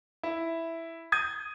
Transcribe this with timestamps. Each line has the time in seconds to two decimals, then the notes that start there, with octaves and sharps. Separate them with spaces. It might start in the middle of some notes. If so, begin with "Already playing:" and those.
0.23 E4
1.12 D#6 G6 G#6 D#7